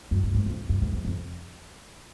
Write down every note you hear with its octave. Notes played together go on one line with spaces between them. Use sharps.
F#2
G2
G#2
F2
F#2
F2
E2
F2